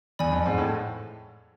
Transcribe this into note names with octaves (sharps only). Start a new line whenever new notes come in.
E2 D5 G#5 B5
F2
G#2
A2